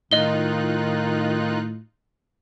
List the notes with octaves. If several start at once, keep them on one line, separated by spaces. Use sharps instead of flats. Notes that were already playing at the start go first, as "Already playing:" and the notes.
A2 D#3 D#4 F4 D#5 F#6 G7